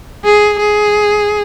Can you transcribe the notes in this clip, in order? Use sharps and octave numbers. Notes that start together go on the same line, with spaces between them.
G#4
G#4